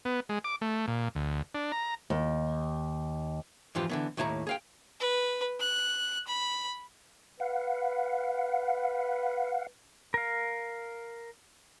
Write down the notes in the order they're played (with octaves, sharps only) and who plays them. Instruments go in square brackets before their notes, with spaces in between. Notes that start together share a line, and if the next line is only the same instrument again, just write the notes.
[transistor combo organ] B3
G#3
D6
A3
A#2
D2
D4
A#5
[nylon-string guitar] D#2
[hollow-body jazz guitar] F2 G#2 E3 C4 F4 G4
D3 E3 B3
D#2 A2 E4 A5 A#5
G#4 F5 G5
[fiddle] B4
F#6
B5
[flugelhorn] B4 [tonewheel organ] F5 F#5
[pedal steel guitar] A#4 F5